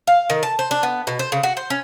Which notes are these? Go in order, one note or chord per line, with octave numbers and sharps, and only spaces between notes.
F5
D#3
A5
C5
D4
B3
B2
C5
C#3
F#4
C5
C#4